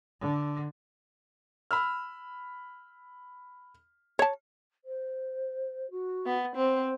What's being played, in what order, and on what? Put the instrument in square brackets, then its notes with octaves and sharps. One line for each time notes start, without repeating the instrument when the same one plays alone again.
[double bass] D3
[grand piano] B5 E6 F6
[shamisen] C#5 A5
[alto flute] C5
F#4
[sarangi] B3
[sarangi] C4 [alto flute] C5